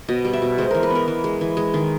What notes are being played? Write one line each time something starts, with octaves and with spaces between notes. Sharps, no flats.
B2 D#5
G3
E5
B2
G#3 C5
E3 A#4
B4
B3 A#4
E3
G#3
E3
G#3
D#3